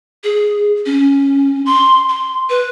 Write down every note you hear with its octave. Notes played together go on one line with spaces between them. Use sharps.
G#4
C#4
C6
C6
B4